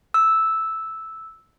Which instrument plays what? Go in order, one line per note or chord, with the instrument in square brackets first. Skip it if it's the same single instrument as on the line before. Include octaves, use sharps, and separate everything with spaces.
[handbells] E6